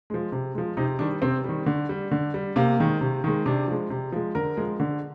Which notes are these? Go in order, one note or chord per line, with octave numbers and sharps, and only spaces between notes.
F3 G#3
C3
F3 G#3
C3 D#4
D#3 G3 D4
C3 C4
D#3 G3
D3
G3
D3
G3
C3 A#3
D#3 G#3
C3
D#3 G#3
C3 D4
F3 G#3
C3
F3 G#3
D3 A#4
F3 G#3
D3